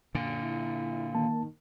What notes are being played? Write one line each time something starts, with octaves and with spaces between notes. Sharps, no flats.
F#2 A#2 D3
E4
D#3 A#3 A5